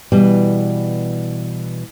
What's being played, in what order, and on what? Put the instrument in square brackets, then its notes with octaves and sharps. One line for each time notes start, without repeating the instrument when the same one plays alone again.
[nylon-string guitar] B2 E3 G3